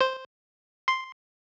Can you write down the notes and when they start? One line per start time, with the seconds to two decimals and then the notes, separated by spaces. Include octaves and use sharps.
0.01 C5
0.88 C6